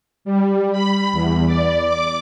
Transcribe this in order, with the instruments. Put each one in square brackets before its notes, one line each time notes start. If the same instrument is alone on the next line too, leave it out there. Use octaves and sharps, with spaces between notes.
[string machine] G3
B5
E2
D5
D6